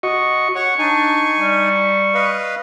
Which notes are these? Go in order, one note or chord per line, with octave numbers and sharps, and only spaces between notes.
F#4 D#5 C#6
C#5 F#5 C#6
D4 D#4 G#5
G3
B4 D#5 F5